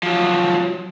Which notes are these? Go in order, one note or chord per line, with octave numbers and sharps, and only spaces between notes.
F3 F#3